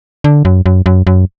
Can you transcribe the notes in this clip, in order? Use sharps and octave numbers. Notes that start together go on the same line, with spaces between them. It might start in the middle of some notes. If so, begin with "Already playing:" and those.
D3
F#2
F#2
F#2
F#2